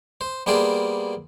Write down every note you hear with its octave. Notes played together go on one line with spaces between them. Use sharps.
C5
G3 A#3 B3 G#4 C5 D5